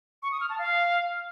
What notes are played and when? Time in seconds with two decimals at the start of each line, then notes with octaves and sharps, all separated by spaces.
0.23 C#6
0.32 D#6
0.41 F6
0.50 A5
0.59 F5